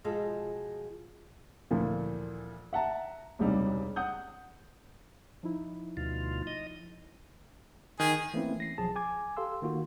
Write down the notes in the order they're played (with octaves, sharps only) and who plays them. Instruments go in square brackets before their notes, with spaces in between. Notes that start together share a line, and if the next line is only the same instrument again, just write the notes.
[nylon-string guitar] B2 F3 G#3 F4 G#4 A4
[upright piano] D2 A#2 E3 F3
E5 F#5 A5 A#5
E1 C#2 C3 G3 D4 D#4
F#5 D#6 G6
[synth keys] F3 D#4 E4
[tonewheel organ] D2 B2 F4
D#5
[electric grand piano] D#3 [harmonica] G#4
[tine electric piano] E3 A3 A#3 C4 C#4 E4
A#6 C7
B1 F3 F#3 G#4 A5
G#5 D6 G#6
G4 A4 F5 C6 E6
D#3 A#3 F4 F#4